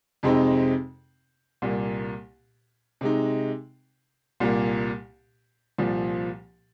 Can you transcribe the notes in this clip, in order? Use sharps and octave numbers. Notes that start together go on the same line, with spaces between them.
F2 C3 G#3 C4 D#4
C2 A#2 A#3
C3 G#3 D#4
C2 A#2 A#3
C2 A#2 F3